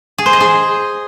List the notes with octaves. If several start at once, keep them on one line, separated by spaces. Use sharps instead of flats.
G#4
C5
D#5
G#4